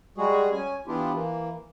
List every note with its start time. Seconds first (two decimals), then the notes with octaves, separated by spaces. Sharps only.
0.18 G3 G#3 F#4 G#4
0.51 C#4 G#5
0.87 E3 B3 D4 E4 F4 G4
1.14 E3 A#3